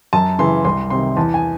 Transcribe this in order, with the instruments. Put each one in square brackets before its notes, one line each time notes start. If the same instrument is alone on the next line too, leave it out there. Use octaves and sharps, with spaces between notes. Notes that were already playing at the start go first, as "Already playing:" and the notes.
[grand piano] F#2 A5
C#3 E3 C6
C2 C6
C3 D#3 C6
E2 A5
G#5